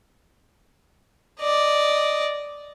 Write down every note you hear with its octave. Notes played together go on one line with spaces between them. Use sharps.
D5 D#5